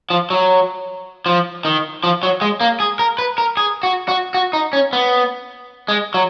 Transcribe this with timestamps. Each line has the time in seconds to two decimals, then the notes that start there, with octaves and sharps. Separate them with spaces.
0.10 F3
0.30 F#3
1.26 F3
1.65 D#3
2.04 F3
2.23 F#3
2.41 G#3
2.61 A#3
2.80 G#4
2.99 A#4
3.19 B4
3.38 A#4
3.57 G#4
3.83 F#4
4.08 F#4
4.34 F#4
4.53 D#4
4.73 C#4
4.93 B3
5.88 G#3
6.14 F#3